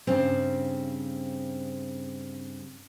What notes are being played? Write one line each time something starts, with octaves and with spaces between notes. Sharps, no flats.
G2 C#3 C4